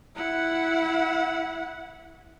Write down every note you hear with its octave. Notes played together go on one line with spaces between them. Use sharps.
E4 F#5